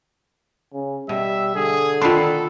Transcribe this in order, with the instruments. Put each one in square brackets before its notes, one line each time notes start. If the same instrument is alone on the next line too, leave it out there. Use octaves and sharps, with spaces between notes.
[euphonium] C#3
[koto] B2 [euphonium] G3 [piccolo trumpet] E5
[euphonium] D3 [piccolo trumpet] G#4
[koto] D#3 D4 [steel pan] F4 B5 C6 [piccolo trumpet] A4